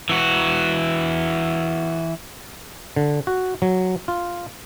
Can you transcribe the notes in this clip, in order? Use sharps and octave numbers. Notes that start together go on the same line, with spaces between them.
E3 F#4
D3
F#4
F#3
F4